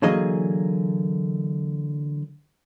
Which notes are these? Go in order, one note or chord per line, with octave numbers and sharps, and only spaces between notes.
D3 E3 F#3 A#3 G#4 D#5